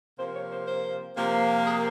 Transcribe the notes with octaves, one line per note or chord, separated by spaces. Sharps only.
C3 F3 A#3 C5
C#5
C5
C5
C3 F3 A#3
G#4